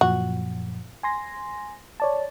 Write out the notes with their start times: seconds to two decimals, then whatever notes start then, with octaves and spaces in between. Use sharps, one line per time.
0.01 F#2 A#2 F3 F#4
1.03 G#5 C6 A#6
2.00 C#5 D5 A5